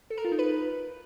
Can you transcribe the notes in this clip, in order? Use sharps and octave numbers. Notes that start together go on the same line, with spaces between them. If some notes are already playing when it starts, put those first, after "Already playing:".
A4
A#4
F4
D#4
B4